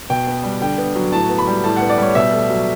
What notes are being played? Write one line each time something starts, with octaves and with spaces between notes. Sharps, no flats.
B2 G5
B3
G3
D3 G5
B3
F#3
A2 A5
B3
B5
G3
A2 A5
B3 F#5
D5
G3 C#5
B2 E5
A3
F#3